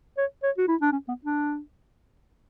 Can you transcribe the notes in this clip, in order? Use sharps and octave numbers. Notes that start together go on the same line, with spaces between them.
C#5
C#5
F#4
E4
D4
C#4
B3
D4